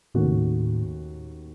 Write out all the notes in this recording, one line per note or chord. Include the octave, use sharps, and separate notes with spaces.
D#2 A2 D#3 A3 C#4 F#4
C3
A2